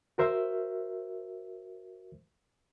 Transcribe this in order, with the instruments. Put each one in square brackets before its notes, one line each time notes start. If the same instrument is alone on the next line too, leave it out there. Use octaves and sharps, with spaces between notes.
[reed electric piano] F#4 A#4 C5 E5